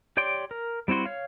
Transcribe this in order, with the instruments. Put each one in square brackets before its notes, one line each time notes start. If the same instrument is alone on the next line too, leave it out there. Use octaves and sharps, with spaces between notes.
[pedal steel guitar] G4 C#5 D5 G5 C6
A#4
G3 C4 E4 F#4 C6
C#5 F5